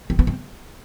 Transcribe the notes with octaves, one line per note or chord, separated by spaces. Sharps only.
C4
B3
C4